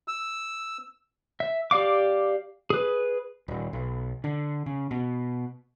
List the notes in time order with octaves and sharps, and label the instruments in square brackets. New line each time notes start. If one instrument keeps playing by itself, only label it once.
[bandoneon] E6
[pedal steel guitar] E5
G4 D5 F5 D6
G#4 B4
[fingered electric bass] D#1
B1
D3
C#3
B2